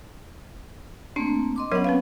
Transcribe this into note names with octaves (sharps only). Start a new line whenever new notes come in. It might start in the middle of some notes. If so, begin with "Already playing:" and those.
A3 A#3 C4 D4
D#5 C6 D6
F#3 B3 C#4 A#4 C#5 F#5
C4 B4 F5